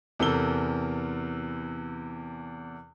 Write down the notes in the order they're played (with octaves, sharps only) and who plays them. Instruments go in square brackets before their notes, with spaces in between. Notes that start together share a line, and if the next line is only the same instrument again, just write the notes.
[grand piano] E2 C3 E3 A4 A#4 G7